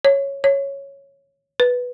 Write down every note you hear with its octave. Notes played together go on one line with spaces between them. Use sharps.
C#5
C#5
B4